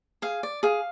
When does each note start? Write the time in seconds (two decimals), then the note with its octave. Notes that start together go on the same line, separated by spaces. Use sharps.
0.22 G#4 F5
0.43 D5
0.63 G#4 F5